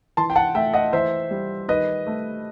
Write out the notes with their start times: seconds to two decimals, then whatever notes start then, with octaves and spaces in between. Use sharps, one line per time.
0.17 E3 A5 C6
0.30 G5
0.36 F#5 A5
0.55 A3 E5 G5
0.74 D#5 F#5
0.93 E3 C5 E5
1.31 G3
1.69 D#3 B4 D#5
2.07 A3